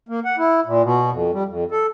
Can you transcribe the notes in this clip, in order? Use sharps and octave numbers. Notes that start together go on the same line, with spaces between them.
A#3
F#5
E4
A#2
B2
F2
G3
F2
A4